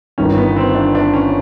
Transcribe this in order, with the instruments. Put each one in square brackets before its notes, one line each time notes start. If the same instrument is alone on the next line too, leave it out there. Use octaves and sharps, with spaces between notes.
[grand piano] G1 G2 D#3 [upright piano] C#4
[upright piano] B3
C4
D4
D4
C#4